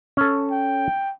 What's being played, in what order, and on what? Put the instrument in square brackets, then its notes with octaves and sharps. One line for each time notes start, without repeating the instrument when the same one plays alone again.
[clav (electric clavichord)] C#4 A4
[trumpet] G5